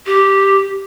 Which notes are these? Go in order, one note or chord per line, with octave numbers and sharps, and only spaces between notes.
G4